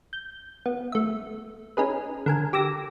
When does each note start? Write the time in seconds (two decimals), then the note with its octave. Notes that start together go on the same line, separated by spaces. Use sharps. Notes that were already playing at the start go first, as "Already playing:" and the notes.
0.13 G6
0.66 B3
0.92 A3 E5
1.77 C#4 D#4 G#4 B4
2.26 D3 A#4 G#5
2.53 G4 D6 E6 A#6